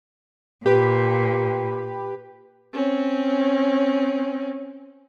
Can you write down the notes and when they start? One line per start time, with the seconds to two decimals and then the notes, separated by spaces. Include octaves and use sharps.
0.66 A#2 G4 B4
2.73 C4 C#4